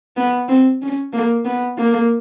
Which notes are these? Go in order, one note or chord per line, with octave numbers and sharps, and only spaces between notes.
B3
C4
C#4
A#3
B3
A#3